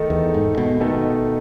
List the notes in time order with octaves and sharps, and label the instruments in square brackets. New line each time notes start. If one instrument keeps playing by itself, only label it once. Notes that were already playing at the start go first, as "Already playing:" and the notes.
Already playing: [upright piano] D#3 A3 D#4 A4
[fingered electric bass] E2
G#2
B2
[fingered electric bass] B2 [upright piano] D#3 A3 D#4 A4